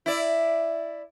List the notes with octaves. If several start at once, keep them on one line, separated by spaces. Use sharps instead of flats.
E4 D5